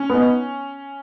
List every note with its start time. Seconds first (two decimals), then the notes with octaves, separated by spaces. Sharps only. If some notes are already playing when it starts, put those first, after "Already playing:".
Already playing: C#4
0.10 B3 D#4